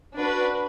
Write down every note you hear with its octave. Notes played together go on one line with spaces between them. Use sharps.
D4 F#4 B4